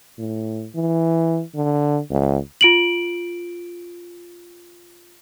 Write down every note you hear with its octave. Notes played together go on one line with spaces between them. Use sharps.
A2
E3
D3
C#2
F4 D7 F#7